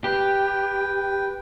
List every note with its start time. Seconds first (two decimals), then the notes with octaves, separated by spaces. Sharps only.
0.04 G4 B4 G5